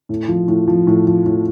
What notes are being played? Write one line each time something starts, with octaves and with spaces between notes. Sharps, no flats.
A2
F3
A2
F3
A2
F3
A2